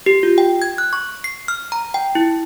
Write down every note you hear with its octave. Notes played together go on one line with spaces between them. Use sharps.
G4
F4
G5
G#6
F#6
C#6
C7
F6
A#5
G5
E4